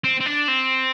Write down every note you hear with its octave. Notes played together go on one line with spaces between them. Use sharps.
C4
C4
D4
C4